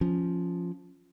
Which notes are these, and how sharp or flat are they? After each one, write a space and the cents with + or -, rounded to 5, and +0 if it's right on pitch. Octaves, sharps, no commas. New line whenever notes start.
F3 +0 C#4 +0